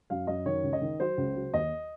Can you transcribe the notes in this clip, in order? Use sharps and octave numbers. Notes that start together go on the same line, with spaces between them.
F#2 F5
F#2 D#5
D#3 C#5
C#2
D#5
D#3
F#3 C5
C#2
F#3
D#2 D#5